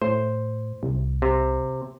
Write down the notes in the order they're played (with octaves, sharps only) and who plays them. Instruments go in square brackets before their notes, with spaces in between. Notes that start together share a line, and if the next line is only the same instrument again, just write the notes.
[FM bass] A2 [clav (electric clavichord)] C5
[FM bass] C2
[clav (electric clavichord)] C3